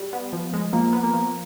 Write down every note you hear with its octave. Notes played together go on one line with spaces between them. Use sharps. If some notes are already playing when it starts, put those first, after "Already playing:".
Already playing: G3
B3
F3
G#3
F3 A#3
B3
A#3
F3